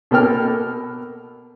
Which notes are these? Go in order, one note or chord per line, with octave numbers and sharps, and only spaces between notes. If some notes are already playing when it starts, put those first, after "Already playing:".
B2 A#3 A4 G5 F6